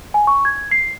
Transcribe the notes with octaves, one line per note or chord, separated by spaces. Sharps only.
G#5
C#6
G#6
C7